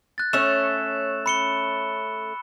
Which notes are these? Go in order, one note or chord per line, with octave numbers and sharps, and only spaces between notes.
F#6 A6
A3 C#4 C#5 C#6 E6 E7
B5 C#7 G7